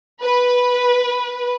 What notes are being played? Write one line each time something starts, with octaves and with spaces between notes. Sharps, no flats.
B4